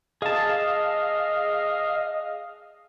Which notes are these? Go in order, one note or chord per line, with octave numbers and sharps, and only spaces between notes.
G#4 D#5 F5 A5